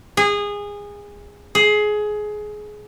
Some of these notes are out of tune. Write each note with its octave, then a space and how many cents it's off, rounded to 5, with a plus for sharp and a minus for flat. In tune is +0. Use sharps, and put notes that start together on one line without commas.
G#4 -20
G#4 +20